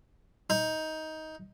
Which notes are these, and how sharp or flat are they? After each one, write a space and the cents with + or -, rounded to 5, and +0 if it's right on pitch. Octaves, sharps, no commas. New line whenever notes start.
D#4 +15